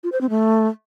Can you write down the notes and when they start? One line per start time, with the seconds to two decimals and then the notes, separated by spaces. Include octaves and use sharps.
0.03 F4
0.12 C5
0.21 C4
0.30 A3